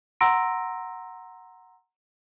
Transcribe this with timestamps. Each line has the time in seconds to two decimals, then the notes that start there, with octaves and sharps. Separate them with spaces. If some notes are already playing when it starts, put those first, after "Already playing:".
0.21 F#5 A#5 C6 E6 A#6 D7